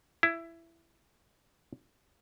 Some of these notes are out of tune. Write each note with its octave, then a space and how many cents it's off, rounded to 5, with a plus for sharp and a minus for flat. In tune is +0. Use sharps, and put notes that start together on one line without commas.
E4 +15